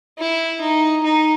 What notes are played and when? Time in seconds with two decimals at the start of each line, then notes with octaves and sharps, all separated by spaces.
0.19 E4
0.61 D#4
1.04 D#4